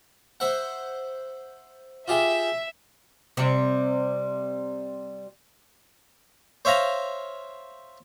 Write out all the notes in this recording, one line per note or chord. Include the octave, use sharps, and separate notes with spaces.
C5 E5 F#5
F4 G4 G#4 E5
C3 G3
C5 C#5 E5 F5 A#5